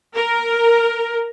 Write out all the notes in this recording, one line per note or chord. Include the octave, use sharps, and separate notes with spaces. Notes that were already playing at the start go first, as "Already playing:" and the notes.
A#4